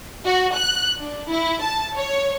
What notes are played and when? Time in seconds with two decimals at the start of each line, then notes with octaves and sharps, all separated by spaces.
0.24 F#4
0.56 F#6
0.98 D4
1.28 E4
1.61 A5
1.96 C#5